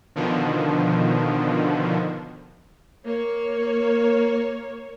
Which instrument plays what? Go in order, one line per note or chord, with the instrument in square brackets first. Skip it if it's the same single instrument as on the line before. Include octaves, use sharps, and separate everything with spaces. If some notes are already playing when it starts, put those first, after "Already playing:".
[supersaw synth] B2 D3 D#3 F3
[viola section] A#3 C#5